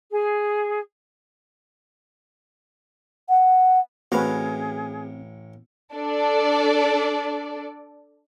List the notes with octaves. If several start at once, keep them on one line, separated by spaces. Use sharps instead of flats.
G#4
F#5
A1 A2 C4 F#4 G#4 B4 F5
D4 A4 D5